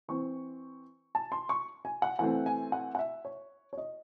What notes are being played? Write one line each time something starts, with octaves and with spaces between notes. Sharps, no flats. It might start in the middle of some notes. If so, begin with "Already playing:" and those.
E3 C4 C#6
A5
C6
C#6
G#5
F#5
E3 A3 C4 F#5
G#5
F#5
F#5
E5
C#5
C#5
D#5